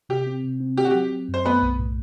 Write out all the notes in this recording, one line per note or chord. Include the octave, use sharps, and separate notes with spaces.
C3 G4
C4
C3
C4
C4 G4
F#4
F#3 G4
F#3
F#2
C5
A3 B3 B4
B1
A2